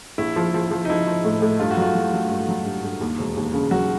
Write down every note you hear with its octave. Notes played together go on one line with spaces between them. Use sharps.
A#1 E4
F3
F3
F3
D#4
F3 E4
F3
A2
A2
G2 F4
F#4
F#3
F4
F#3
F#3
G2
F#3
G2
G2
D#2
E1
D#2
C#3
F#3 F#4